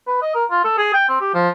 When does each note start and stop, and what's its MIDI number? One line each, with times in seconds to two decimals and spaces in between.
0.07 0.21 71
0.22 0.32 75
0.35 0.44 70
0.50 0.63 65
0.65 0.74 69
0.78 0.93 68
0.94 1.06 79
1.09 1.20 60
1.21 1.30 67
1.34 1.49 53